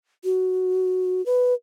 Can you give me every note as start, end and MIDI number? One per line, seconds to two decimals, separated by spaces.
0.24 1.24 66
1.26 1.54 71